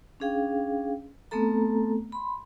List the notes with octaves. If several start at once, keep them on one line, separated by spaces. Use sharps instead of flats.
C#4 D4 G#4 F5 G5
A3 B3 C4 A4 A#5
B5 C6